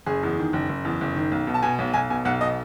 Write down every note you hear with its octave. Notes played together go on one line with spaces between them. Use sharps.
F#1 G#4
E2
D#3
F#1
F#1
E2
F#1
D#3
B1
B2
A5
B2 G#5
B1
B1 G#5
B2 G#5
B1 F#5
B2 D#5